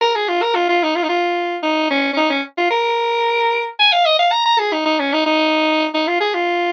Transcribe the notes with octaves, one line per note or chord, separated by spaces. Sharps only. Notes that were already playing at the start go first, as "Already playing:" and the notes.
A#4
G#4
F4
A#4
F4
F4
D#4
F4
D#4
F4
D#4
C#4
C#4
D#4
C#4
F4
A#4
G#5
F5
D#5
F5
A#5
A#5
G#4
D#4
D#4
C#4
D#4
D#4
D#4
F4
G#4
F4